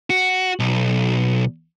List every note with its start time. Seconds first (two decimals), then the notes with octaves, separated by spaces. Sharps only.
0.10 F#4
0.60 B1